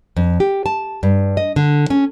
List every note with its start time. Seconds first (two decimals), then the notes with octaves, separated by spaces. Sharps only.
0.16 F2
0.40 G4
0.66 A5
1.03 G2
1.37 D#5
1.56 D3
1.90 C#4